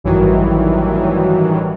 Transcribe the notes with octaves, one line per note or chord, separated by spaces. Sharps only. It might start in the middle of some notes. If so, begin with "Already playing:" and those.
A1 G2 D#3 E3 F#3